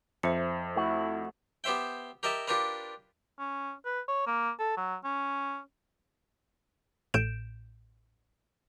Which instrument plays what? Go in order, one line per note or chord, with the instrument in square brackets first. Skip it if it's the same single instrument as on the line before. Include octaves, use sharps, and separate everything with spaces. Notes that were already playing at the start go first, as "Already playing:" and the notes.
[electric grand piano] F2 [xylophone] C5 E5 C#7
[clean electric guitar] A3 F#4 [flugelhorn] E4
[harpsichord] B3 G4 C5 E5 G5
G4 A#4 D#5 E5 A5
D4 F4 G4 A#4 B4
[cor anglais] C#4
B4
C#5
A#3
A4
F#3
C#4
[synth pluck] A1 A2 G6 D7 E7